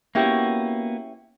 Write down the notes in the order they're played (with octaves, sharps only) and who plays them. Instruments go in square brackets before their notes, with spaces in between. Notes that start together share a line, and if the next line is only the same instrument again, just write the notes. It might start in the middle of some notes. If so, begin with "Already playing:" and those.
[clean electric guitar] A#3 B3 F#4 [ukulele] C#4 E4 G4